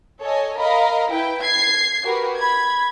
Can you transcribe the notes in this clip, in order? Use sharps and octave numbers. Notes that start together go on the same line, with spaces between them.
A4 C#5 D#5 G#5
A#4 D#5 F5 A#5 B5
E4 B4 G5
G#6 C7
F#4 G4 A#4 B4
B5 G#6